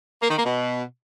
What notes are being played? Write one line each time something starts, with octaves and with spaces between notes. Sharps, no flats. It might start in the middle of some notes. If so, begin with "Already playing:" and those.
A#3
D#3
A#3
B2